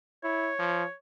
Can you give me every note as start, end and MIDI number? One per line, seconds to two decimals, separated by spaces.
0.24 0.52 64
0.24 0.94 73
0.59 0.84 53